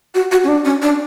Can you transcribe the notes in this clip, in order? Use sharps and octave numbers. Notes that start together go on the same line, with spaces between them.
F#4
F#4
C#4
D4
C#4
D4